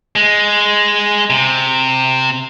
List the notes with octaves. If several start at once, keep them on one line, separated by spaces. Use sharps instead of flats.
G#3
C3